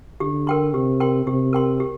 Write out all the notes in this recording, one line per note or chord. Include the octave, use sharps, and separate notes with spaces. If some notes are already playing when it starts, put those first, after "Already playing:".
D3 G4
A#4 G5 C6
C3 G4
A#4 G5 C6
C3 G4
A#4 G5 C6
G4